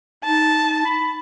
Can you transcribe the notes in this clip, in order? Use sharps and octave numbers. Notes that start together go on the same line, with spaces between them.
D#4 A5
B5